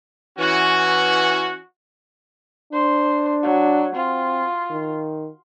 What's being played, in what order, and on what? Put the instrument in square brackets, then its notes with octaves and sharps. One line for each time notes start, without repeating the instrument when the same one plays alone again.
[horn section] E3 C#4 F#4
[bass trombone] D4 [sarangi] C5
[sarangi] F#3
[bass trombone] C4 [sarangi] F4
[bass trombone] D#3